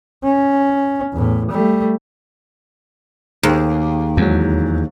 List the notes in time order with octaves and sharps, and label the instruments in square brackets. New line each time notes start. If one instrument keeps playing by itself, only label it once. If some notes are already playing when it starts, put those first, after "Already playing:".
[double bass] C#4
E2 A2
G3 A3
[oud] D#2 [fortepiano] G4 G#4
[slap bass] E2 [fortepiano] G#2 F#3